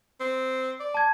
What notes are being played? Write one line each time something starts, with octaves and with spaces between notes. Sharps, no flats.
C4
D5
A5 G#6